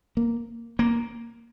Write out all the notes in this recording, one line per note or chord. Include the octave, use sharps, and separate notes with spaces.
A#3
A#3